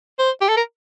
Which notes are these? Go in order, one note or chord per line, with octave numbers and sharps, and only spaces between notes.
C5
G4
A4
A#4